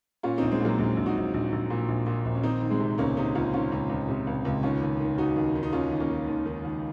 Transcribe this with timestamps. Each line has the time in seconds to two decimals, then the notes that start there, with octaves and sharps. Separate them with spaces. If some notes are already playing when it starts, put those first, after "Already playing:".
0.23 A#2 C#4 F4
0.38 A#1 C4 D#4
0.52 G#3 C4
0.60 A#2 F#3 A#3
0.79 A#1 G#3
0.97 A#1
1.06 D#4 F#4
1.16 A#1
1.34 A#1
1.52 A#1
1.70 A#2
1.88 A#1
2.07 A#2
2.25 A#1
2.35 C#4
2.43 D#3 C4 D#4
2.62 D#3
2.70 G#3 C4
2.80 C3
2.98 C#2 A#3 C#4
3.17 C3 C4 D#4
3.35 C#2 C#4 F4
3.53 D#3 C#4 F4
3.72 C#2
3.89 C#2
4.09 C3
4.27 C#2
4.45 C#2
4.63 D#2 C#4 F4
4.82 D#2
5.00 D#3
5.18 D#3 D#4 F#4
5.36 D#2
5.55 D#3
5.63 D#4
5.73 D#2 C#4 F4
5.92 D#2
6.00 A#3 C#4
6.10 D#3
6.28 D#2
6.46 D#3
6.65 D#2